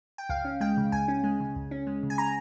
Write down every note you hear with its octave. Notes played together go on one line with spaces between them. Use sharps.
G5
C#2 F5
C#4
G#3 G5
C#3
C#2 G#5
C#4
G#3
C#3
C#2
C#4
G#3
C#3
G#5
A#5